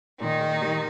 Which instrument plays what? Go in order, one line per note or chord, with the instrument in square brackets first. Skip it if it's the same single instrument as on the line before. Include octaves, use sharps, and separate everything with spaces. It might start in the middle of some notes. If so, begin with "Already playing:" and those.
[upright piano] A#2 [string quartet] D#3 D#4
[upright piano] A#3
G3